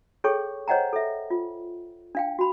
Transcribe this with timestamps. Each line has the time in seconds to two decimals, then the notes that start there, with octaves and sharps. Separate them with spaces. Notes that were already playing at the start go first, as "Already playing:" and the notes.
0.24 G#4 A4 C#5 G5 C#6
0.68 C5 C#5 D#5 F#5 G5 A#5
0.93 A4 E5
1.30 F4
2.15 D4 F5 G5
2.39 F#4 B5